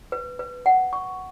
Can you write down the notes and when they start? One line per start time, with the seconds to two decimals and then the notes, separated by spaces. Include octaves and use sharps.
0.12 B4
0.39 B4
0.66 F#5
0.93 C#6